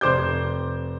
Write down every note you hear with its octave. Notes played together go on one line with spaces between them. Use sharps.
F1 C5 D6 G6